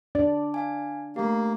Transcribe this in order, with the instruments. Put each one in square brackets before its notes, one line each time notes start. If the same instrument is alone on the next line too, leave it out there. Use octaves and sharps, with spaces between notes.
[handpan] D4 [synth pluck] D5
[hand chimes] F5 G#5
[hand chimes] A3 G4 [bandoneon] A#3